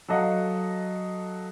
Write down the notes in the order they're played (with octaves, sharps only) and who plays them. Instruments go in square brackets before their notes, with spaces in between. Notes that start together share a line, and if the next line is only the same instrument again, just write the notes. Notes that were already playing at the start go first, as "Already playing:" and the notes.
[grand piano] F#3 A4 D#5 F5 F#5